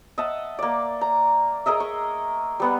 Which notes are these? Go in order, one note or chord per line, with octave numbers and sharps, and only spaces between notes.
D#5 E5 F#5 A5
A#3 D5
A#5
G#4 A#4 D#5 E5
C#6
G3 B3 F#5